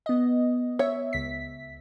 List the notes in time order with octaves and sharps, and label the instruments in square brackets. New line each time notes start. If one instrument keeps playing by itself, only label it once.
[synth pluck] B3 D#5
[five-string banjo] C#5 [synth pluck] E5
[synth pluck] C#2 B6